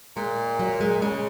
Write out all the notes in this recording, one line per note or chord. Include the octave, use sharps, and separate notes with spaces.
A#2 G#3
F#3
G#3
C#3 G#3